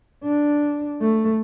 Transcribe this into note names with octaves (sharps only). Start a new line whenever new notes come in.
D4
A3